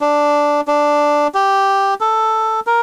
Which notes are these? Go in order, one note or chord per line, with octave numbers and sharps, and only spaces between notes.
D4
D4
G4
A4
A#4